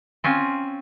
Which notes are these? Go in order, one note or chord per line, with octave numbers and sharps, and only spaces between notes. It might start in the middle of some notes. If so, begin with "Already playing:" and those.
C4 C#4 F4